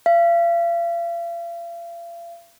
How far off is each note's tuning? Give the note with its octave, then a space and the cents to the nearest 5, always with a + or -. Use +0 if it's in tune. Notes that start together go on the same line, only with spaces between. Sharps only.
F5 -40